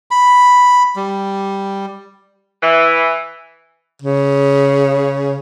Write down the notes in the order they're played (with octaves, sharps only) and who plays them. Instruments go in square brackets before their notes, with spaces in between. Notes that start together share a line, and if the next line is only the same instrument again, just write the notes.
[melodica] B5
G3
[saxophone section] E3
[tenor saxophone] C#3